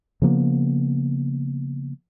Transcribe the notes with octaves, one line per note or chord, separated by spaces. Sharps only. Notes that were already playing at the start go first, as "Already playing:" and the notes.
C#3 F3 A#3 B3